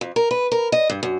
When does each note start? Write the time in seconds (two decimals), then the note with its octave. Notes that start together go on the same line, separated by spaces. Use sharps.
0.01 F2
0.16 A#4
0.31 B4
0.52 A#4
0.72 D#5
0.90 G2
1.03 F#2